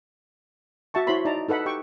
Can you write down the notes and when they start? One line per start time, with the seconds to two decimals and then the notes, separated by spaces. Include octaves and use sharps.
0.94 F#4 E5 A5 C#6
1.07 E4 F#4 C5 C#5 B5 C6
1.25 D#4 D5 A5 A#5
1.48 D#4 A4 B4 F#5 B5
1.66 G4 G5 C#6